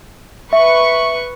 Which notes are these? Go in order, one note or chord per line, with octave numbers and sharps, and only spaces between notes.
B4 E5 C#6